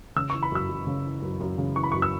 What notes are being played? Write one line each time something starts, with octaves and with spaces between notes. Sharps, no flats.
C#3 E6
E3 C#6
B5
F#2 E6
F#2
C#3
E3
F#2
F#2
C#3
E3 C#6
B5
F#2 C#6
E6